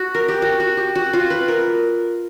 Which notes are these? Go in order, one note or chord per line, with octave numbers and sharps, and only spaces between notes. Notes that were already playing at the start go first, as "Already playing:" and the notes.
Already playing: F#4
A#4
G4
F#4
F#4
G4
F#4
F4
B4
A#4